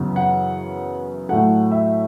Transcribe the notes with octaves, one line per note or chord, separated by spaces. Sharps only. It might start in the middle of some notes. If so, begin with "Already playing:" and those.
Already playing: F#2 C#3 E3 B3
F#5
A2 F#3 A3 F#5
E5